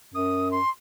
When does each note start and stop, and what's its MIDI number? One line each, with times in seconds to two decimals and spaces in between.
0.14 0.59 42
0.14 0.48 87
0.51 0.69 84